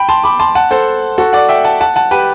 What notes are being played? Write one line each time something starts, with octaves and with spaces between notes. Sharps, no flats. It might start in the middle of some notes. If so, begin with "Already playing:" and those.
Already playing: G5 B5
A5 C6
B5 D6
A5 C6
F#5 A5
A4 C5
F#4 A4
D5 F#5
E5 G5
F#5 A5
F#5 A5
F#5 A5
G4 B4